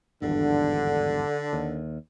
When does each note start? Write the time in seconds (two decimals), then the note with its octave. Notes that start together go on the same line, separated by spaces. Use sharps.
0.22 G#1 E2 G2 D3
1.53 D#2